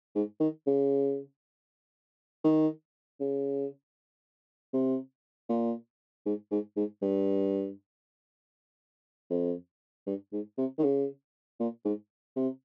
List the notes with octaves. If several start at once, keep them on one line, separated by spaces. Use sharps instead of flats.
G#2
D#3
C#3
D#3
C#3
C3
A#2
G#2
G#2
G#2
G2
F2
G2
G#2
C3
D#3
C#3
A#2
G#2
C3